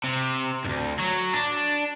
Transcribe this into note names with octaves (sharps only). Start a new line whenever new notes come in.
C3
D2 G2
F#3
D4